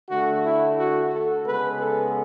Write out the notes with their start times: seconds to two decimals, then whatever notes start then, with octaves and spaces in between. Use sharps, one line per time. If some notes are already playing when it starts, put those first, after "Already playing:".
0.10 D3 A3 F#4
0.44 E4
0.78 F#4
1.12 A4
1.45 C#3 G#3 B3 B4
1.79 A4